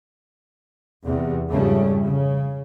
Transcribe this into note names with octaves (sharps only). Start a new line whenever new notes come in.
E2 C3
F2 G#2 C#3 G3 A3 C#4
C#3